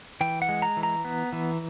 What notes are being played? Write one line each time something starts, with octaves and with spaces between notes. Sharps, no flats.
E3 G5
F#5
G#3
A#5
E3
A#5
B3
E3